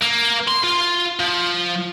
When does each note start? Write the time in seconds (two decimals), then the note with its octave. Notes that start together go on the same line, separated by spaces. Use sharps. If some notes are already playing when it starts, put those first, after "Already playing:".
0.01 A#3
0.48 C6
0.64 F4
1.20 F3